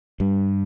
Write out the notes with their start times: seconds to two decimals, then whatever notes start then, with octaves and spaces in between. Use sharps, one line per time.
0.20 G2 G3